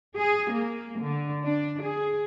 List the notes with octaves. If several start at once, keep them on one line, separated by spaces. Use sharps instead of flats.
G#4
A#3
D3
D4
G#4